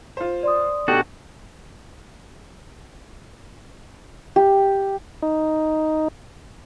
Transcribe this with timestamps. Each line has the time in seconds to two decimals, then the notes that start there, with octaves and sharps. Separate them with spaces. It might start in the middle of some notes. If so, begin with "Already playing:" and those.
0.17 F4 C5
0.43 D5 C6 D#6
0.88 B2 D4 F#4 G4 A4 F#5
4.36 G4
5.22 D#4